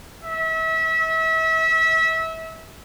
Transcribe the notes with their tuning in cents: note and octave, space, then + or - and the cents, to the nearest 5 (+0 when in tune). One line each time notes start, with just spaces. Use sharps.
E5 -30